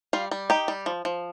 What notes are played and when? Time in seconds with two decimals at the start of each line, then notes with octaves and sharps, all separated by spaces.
0.13 G3 F4 F5
0.31 G3
0.50 D#4 G4 G5
0.68 G3
0.86 F3
1.05 F3